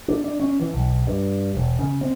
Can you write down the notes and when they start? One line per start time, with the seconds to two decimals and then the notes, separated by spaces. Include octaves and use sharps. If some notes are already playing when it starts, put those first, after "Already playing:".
0.08 D4
0.24 D4
0.40 C#4
0.60 E3
0.73 B1
1.07 G2
1.55 E1
1.79 C#3
2.01 C4